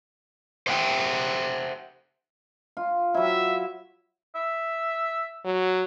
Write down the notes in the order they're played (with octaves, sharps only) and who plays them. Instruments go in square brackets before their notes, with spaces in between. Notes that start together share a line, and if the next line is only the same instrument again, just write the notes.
[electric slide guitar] C5 E5 F#5 G5
[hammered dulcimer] F4
[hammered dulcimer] F#3 E4 [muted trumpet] E5
[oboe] E5
[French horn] F#3